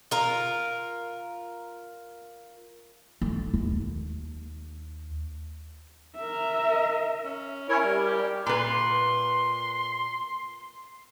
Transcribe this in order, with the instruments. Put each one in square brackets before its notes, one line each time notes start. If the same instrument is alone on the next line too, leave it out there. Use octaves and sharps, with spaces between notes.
[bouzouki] F4 A#4
[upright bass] A3
D#2
[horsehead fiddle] A#4 E5
[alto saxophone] C#4
[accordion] C#4 E4 C#5 [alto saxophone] A#4
[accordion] G3
[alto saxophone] G4
[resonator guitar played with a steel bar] A#2 B4 [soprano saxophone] C6